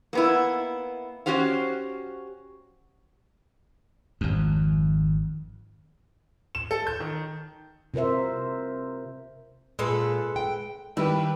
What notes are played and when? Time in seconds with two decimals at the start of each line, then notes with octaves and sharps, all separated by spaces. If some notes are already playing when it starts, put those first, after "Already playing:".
0.13 A#3 B3 E4
1.26 C#4 F#4 G4 C5 F5
4.21 G#1 F2
6.55 E7
6.71 A4
6.87 G6
7.00 D#3
7.94 C3 F4 A#4 C5 E5
9.79 A#2 G#3 A4 B4
10.36 G5
10.97 D#3 G3 E4 G4 B4